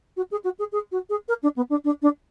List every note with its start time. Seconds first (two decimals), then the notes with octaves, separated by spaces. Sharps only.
0.17 F#4
0.31 G#4
0.44 F#4
0.59 G#4
0.72 G#4
0.92 F#4
1.09 G#4
1.28 A#4
1.43 D4
1.56 B3
1.70 D4
1.84 D4
2.02 D4